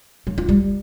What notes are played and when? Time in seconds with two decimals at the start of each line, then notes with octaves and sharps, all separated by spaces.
0.27 F#3
0.38 F4
0.49 G3